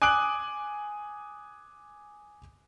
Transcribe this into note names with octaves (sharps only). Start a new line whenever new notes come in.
G#5 D6 D#6 F#6 D7 F#7